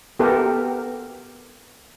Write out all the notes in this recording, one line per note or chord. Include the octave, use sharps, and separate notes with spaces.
B3 G4 A4 A#4